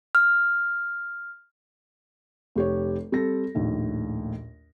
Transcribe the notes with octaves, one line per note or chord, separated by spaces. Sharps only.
F6
F1 G4 C#5
G3 C4 A4 A#6
A#1 D#2 A2